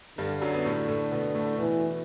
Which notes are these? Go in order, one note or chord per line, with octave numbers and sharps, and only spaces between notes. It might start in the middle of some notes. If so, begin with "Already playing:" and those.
G2 D3 G3
F#2 F#3
B3
A2 A3
A2 A3
B2 B3
A2 A3
B2 E3